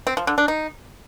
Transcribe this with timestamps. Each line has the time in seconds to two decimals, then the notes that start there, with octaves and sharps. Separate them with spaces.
0.07 C4
0.17 F3
0.27 D3
0.38 D4
0.48 D#4